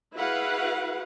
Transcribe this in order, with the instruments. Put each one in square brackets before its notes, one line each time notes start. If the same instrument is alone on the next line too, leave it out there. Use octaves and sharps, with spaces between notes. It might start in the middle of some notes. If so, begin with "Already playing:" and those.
[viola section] E4 F#4 G#4 B4 F5 F#5